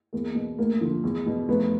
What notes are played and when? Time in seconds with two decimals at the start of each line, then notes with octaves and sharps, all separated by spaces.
0.13 E2 A#3
0.35 B2
0.58 D2 A#3
0.81 D3 F3
1.04 E2
1.26 B2
1.48 F1 B3